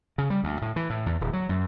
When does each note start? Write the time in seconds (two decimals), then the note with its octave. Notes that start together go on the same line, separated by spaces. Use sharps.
0.18 C#3
0.30 G3
0.44 D2
0.62 A2
0.76 E3
0.90 A2
1.06 E2
1.21 D1
1.33 F#3
1.49 F#2